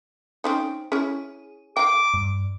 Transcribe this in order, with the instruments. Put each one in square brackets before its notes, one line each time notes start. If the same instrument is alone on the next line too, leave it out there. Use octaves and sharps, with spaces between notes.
[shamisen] C4 C#4 D#4
[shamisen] C#4 E4 [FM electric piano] G#4
[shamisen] F5 G5 [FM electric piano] A#5 [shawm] D6
[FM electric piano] G2